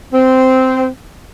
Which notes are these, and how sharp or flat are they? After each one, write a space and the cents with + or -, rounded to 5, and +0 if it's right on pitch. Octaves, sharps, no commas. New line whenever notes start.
C4 -10